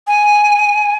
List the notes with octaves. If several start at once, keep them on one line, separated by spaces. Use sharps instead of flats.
G#5